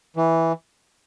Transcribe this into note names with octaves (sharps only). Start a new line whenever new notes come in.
E3